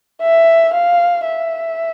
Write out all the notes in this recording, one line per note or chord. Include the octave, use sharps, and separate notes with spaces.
E5
F5
E5